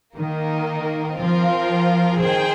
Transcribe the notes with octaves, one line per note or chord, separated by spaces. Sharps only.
D#3 A#3 D#4 A#4 D#5
F3 C4 F4 A#4 F5
D#3 G#4 C5 G5